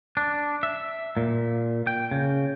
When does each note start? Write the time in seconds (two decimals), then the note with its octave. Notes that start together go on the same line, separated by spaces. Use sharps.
0.17 D4
0.63 E5
1.17 A#2
1.87 G5
2.11 C#3